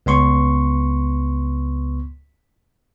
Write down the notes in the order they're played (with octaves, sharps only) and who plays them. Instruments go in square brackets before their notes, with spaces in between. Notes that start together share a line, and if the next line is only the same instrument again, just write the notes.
[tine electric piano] C#2 B3 C6 C#6